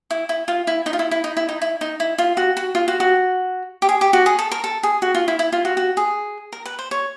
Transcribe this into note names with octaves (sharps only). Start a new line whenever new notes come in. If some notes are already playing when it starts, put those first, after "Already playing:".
E4
E4
F4
E4
D#4
F4
E4
E4
D#4
E4
D#4
E4
D#4
E4
F4
F#4
F#4
F4
F#4
F#4
G4
G#4
G4
F#4
G#4
A4
A#4
A4
G#4
F#4
F4
E4
E4
F4
F#4
F#4
G#4
A#4
B4
C5
C#5